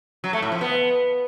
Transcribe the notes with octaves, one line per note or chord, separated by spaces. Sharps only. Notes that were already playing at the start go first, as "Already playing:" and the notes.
F#3
A3
A2
F3
B3